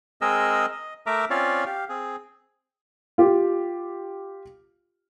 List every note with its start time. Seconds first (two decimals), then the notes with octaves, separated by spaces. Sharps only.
0.21 G#3 C4 G#4 A#4 D#5 E6
0.72 D#5
1.06 A3 A#4 E5 A#5 D6
1.30 C4 C#4 F4 C#5 D5 F5
1.66 G4 F5
1.89 C4 G#4
3.18 F4 G4